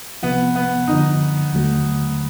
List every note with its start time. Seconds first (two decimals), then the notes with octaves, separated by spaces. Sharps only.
0.23 C2 C3 F3 B3
0.55 B3
0.87 F#2 D3 F3 D#4
1.52 D#2 D3 F#3 A3